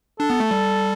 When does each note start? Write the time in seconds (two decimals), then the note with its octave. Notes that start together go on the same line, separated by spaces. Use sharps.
0.20 D4 A4
0.30 B3
0.40 A3
0.51 G3